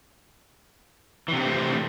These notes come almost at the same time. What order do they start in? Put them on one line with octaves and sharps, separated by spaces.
E3 C3 B3 C4 A3